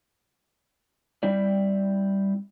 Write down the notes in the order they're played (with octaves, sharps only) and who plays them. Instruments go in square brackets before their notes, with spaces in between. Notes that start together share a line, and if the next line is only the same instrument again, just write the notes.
[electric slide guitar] G3 C4 E4 D5